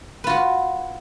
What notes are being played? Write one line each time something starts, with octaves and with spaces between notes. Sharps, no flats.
F4 F#4 B4